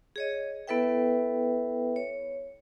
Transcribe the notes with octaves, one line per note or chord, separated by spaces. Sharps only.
G#4 C#5 D#5
B3 E4 A4 B4 E5 G5
C#5